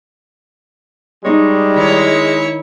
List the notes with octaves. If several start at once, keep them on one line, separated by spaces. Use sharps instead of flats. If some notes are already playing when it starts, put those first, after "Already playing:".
G3 G#3 D#4 C#5
D#3 E4 C#5